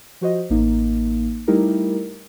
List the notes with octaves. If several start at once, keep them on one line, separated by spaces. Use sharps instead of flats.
F3 F#4 C5 D#5
A1 A#3 D#4
G3 A3 D#4 E4 G4 A#4